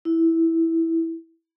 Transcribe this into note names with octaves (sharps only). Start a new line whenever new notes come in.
E4